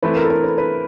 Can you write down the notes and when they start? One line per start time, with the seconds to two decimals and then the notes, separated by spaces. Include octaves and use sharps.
0.03 E3 A3 C4 E4 B4
0.17 A#4
0.24 A4
0.30 A#4
0.44 B4
0.58 B4